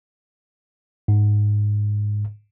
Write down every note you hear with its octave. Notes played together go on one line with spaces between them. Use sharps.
G#2